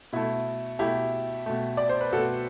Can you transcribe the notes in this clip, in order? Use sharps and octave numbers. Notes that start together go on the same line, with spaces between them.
B2 A3 E4
B2 A3 E4 G4
B2 A3
D5
C5
B4
B2 A3 F#4 A4